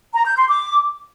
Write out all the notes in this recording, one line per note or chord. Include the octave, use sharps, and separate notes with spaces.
A#5
G6
C6
D6